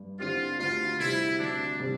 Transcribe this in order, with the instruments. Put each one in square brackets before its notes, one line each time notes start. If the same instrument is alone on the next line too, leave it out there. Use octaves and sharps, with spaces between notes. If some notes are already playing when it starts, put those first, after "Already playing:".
Already playing: [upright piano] G2
[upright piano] D3 G3 C4 G4 [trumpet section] F4
[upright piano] D2 [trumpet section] F4
[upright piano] C3 G3 C4 G4 [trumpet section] E4
[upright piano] D2 [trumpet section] D4
[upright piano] C3 G3 C4 G4